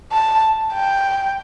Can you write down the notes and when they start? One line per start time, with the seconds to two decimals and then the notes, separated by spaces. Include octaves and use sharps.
0.12 A5
0.73 G5